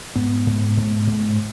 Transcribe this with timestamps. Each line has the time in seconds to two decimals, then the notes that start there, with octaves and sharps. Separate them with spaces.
0.16 G#2 B3
0.47 G#2
0.77 G#2
1.07 G#2